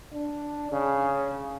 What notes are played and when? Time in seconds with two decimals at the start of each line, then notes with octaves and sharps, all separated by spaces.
0.13 D4
0.72 C#3